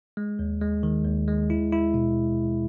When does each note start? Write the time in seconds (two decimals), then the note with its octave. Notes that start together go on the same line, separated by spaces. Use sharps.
0.17 G#3
0.39 D#2
0.61 G#3
0.83 D#3
1.05 D#2
1.28 G#3
1.50 E4
1.72 E4
1.94 B2